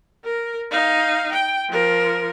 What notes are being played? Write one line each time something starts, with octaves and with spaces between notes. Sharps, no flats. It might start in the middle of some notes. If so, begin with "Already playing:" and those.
A#4
D#4 F5
G5
F3 A#4